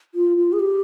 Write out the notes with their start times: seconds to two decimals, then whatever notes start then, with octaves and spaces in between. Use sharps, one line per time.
0.15 F4
0.38 F4
0.53 G#4
0.60 G4